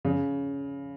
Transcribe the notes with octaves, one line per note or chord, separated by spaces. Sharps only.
C#3